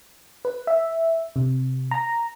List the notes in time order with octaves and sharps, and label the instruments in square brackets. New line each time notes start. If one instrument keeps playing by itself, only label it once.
[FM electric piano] B4
E5
C3
A#5